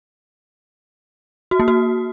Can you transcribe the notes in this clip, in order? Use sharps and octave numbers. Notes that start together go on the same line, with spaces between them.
F#4
A#3
F#4